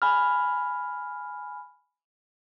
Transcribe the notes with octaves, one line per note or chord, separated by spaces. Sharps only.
G#5 B5 F6